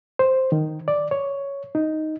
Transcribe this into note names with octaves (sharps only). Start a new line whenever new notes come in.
C5
D#3
D5
C#5
D#4